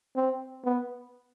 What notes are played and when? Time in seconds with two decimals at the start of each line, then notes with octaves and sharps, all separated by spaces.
0.16 C4
0.65 B3